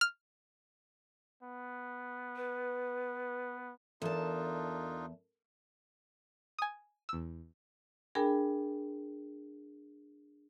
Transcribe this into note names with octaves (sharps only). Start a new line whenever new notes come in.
F6
B3
B4
E2 D4 D#4 F4 A4 A#4 A5
G#5 D#6
E2 E6
D4 G#4 A#4 G5 G#5 B5